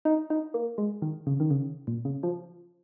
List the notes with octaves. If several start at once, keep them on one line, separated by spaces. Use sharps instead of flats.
D#4
D#4
A#3
G#3
D#3
C#3
D#3
C#3
A#2
C#3
F3